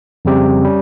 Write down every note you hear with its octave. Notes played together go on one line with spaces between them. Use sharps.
F2 C#3 G3 C4 G4
G3 C#4